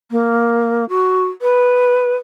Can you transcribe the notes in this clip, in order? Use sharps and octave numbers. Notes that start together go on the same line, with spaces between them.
A#3
F#4
B4